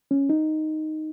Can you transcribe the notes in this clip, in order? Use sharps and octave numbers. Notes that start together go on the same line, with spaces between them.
C#4
D#4